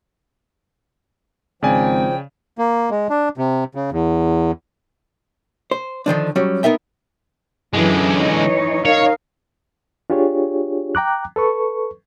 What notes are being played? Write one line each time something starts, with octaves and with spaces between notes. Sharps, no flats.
G#1 C#3 F3 D5 G5 G#5
A#3
G#3
D4
C3
C#3
E2
C5
D3 D#3 F3 D4
F#3 G3 C#4 F#4
B3 D#4 A#4 E5 G5
F#2 D3 E3 G#3
E3 D#4 C#5
D#4 A#4 C#5 F5
D4 F4 G4 G#4 C#5
G5 A#5 D6 F#6
A4 B4 C#6